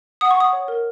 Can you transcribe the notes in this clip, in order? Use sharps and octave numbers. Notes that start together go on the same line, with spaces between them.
F#5 D#6
C#6
F#5 D#6
C#5
A#4